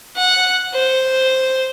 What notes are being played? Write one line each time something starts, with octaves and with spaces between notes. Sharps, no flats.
F#5
C5